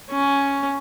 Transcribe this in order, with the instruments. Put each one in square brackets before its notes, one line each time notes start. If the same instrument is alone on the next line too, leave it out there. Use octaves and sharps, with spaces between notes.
[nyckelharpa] C#4